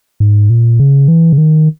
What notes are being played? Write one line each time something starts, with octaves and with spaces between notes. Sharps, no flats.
G#2
A#2
C#3
E3
C#3
D#3